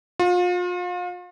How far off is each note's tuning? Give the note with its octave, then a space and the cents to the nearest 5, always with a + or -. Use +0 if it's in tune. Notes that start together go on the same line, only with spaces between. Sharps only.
F4 +35